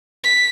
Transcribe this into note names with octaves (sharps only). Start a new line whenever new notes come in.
B6